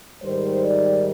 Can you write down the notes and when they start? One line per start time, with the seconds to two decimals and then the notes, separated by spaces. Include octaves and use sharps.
0.22 G#2 D#3 G3 C5
0.63 D5